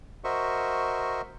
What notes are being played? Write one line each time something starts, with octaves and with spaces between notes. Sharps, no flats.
F#4 A#4 C5 D#5 E5 C#6